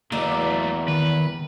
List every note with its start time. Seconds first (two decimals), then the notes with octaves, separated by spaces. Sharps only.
0.12 E2 F#3 A3 A#3 D5 D#5
0.88 D#3 B4